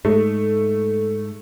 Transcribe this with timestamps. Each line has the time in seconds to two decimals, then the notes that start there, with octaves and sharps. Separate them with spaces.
0.05 G#2 A3